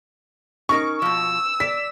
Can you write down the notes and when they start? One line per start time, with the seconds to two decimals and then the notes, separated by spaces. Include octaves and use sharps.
0.69 C#4 D#4 A#4 C#6
1.02 B2 F3 E6
1.60 D5 B6